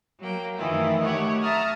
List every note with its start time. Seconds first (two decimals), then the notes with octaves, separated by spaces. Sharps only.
0.19 F#3 A#3 G5
0.56 F#2 D#3 E3 A3 E4 F4
1.03 A3 G4 C#5 F#5
1.41 E5 A5 A#5 D#6 F6